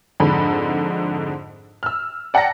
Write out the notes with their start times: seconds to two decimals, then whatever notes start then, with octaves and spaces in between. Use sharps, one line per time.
0.20 F2 G#2 D3 B5
1.83 E6 F6
2.34 D5 F#5 G5 A5 A#5 A#6